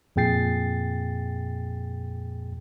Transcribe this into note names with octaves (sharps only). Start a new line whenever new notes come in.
F2 A#2 G#4 G5 A6 C7